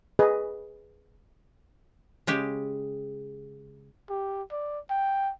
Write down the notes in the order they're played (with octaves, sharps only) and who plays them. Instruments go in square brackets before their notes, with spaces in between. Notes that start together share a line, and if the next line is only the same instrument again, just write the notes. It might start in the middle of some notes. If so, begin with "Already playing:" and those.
[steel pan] G#4 B4 D#5
[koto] C#3 G#3 G4
[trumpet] G4
D5
G5